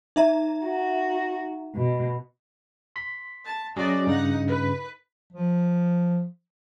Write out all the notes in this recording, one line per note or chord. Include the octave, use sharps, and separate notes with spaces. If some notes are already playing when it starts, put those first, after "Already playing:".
D#4 E5 A#5
F#4
B2
C6 B6
A5
F#3 C#4 F#4 G#4 D5 D#5
G2 C#3 D#4 F#5
B4
F3